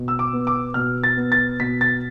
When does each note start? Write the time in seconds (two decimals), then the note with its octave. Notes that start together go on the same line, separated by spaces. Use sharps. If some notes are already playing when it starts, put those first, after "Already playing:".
Already playing: B2
0.08 E6
0.19 D6
0.33 B3
0.47 D6
0.74 B2 F6
1.04 A6
1.17 B3
1.32 A6
1.60 B2 B6
1.81 A6